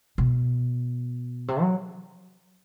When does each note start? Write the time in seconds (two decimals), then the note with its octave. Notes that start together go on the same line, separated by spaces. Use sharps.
0.18 B2
1.48 C3
1.61 F#3